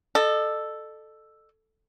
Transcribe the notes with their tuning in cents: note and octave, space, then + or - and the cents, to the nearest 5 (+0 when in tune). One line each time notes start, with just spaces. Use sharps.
A4 +0 D#5 -40